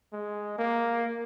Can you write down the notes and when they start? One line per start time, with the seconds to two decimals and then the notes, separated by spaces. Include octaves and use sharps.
0.13 G#3
0.58 A#3